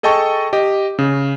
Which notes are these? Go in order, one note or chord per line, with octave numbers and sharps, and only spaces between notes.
G#4 A4 D#5 G5 A5 C#6
G4 D#5
C#3